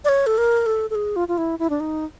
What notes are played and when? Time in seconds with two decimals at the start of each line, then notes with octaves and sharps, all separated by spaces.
0.05 D5
0.09 C#5
0.27 A4
0.38 A#4
0.66 A4
0.90 A4
0.95 G#4
1.16 F4
1.28 F4
1.38 E4
1.59 E4
1.70 D4
1.80 D#4